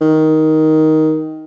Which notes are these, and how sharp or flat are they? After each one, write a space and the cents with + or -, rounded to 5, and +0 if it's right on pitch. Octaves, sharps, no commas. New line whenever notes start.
D#3 +10